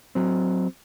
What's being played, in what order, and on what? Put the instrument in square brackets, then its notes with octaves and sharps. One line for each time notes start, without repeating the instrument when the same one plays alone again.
[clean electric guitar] F#3 C4